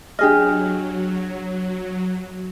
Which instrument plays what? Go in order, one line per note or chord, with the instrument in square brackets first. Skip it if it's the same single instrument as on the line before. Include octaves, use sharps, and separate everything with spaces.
[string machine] F#3 [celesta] D4 F6 [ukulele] G4 G#4 D#5